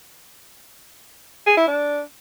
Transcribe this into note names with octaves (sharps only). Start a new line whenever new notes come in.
G#4
E4
D4